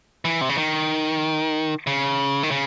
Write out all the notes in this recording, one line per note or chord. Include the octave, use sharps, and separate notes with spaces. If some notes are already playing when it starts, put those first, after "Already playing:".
E3
C3
C#3
D#3
C#3
D#3
C#3